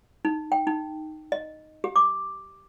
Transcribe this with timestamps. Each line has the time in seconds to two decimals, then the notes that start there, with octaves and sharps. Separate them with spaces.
0.25 D#4
0.52 G5
0.67 D#4
1.32 D#5
1.84 G4
1.96 D6